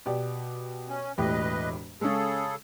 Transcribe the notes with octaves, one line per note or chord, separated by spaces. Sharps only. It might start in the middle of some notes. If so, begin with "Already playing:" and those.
B2 G4 D5
C#4
E1 A2 G4 B4 D#5
C#3 G#3 C#4 G#4 A4